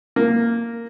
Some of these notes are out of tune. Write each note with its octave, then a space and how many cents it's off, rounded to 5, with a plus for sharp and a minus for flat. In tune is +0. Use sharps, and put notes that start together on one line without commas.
A#3 -5